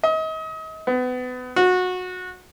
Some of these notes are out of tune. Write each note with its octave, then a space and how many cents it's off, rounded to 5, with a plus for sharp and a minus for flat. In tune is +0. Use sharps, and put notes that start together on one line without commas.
D#5 +35
B3 +30
F#4 -20